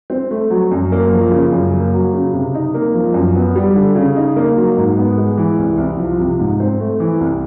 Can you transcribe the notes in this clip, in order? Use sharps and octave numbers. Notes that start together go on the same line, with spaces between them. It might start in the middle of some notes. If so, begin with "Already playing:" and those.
C4
A3
F#3
F#2
A#3
F3
C#3
F#2
A#3
F#3
C#3
C3
D#4
A#3
F3
F#2
B3
G3
D3
C#3
D#4
A#3
F#3
G#2
B3
G#3
E3
C2
C2
F3
C3
G#2
C4
A3
E3
C2